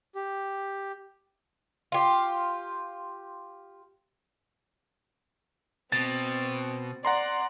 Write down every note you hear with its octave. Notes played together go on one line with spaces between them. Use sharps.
G4
F4 G4
B2 C4 A6
D5 F#5 A#5 C6